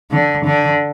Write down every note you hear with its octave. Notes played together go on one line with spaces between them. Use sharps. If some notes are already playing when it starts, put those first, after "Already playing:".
D3
D3